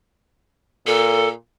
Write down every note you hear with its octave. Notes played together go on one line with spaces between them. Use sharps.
A#2 A4